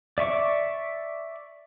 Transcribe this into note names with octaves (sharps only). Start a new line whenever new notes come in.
D5 E5 C#6 D6